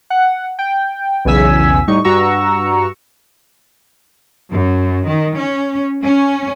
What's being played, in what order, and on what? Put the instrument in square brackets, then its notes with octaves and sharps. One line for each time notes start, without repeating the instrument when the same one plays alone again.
[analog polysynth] F#5
G5
B1 E2 C#3 G#5 E6 B6
A2 G3 D#4 C#6
G2 F#4 A#5 C#6 E6
[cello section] F#2
D#3
C#4
C#4